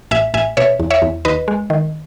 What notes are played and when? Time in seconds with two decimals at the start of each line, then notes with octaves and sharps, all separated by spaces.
0.11 A1 E5 G#5
0.34 A1 E5 G#5
0.57 B2 C#5 E5
0.80 E2
0.90 C#5 E5
1.02 E2
1.25 D#2 B4 D#5
1.48 G#3
1.70 D#3